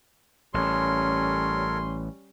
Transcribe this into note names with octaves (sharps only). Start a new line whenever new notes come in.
A1 G3 C#4 A4 A#4 C#5 C6